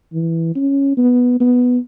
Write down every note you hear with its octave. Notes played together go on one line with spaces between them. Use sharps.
E3
C#4
B3
B3